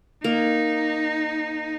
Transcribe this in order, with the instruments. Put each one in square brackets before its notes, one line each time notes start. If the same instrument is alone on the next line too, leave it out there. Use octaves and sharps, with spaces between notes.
[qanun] A#3 [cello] D#4